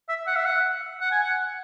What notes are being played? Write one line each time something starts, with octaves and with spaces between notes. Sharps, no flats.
E5
F#5
E5
F#5
F#5
G#5
F#5